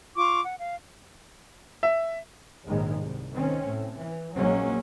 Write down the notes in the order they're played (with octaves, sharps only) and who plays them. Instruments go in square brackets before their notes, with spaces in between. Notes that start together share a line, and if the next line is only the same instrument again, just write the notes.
[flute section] F4 C#6 D6
F#5
F5
[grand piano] E5
[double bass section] A#1 D#2 G#2 D#3 G#3
C2
D#3 C4 C#4
A2
E3
A#1 F#3 G#3 A#3 C#4